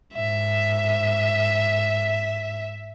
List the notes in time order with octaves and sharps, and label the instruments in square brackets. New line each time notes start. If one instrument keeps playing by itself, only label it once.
[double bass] G#2 [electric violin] E5